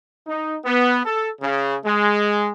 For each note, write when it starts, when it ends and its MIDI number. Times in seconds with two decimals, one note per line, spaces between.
0.27 0.56 63
0.65 1.01 59
1.05 1.30 69
1.41 1.76 49
1.85 2.51 56